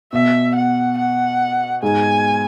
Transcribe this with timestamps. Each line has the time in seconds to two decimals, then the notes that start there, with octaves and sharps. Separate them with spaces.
0.13 B2 E5
0.56 F#5
0.98 F#5
1.83 G#2 G#5